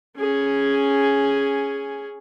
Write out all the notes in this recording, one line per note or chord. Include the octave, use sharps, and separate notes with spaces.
C#4 G#4